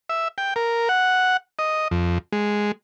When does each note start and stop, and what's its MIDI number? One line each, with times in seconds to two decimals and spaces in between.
0.09 0.28 76
0.38 0.54 79
0.56 0.89 70
0.89 1.37 78
1.59 1.88 75
1.91 2.18 41
2.33 2.72 56